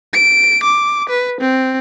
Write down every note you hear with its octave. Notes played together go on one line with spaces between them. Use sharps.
D7
D6
B4
C4